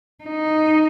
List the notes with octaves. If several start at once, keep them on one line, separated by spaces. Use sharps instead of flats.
D#4